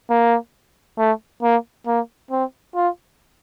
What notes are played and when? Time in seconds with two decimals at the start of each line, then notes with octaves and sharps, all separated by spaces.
0.10 A#3
0.99 A3
1.43 A#3
1.87 A#3
2.31 C4
2.75 F4